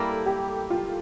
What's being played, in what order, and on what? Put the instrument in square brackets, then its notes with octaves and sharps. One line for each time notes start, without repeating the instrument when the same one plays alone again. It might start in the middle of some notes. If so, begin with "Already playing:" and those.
Already playing: [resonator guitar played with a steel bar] G3 A#3 E4 A#4 [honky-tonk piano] A4
[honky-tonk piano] G4
F4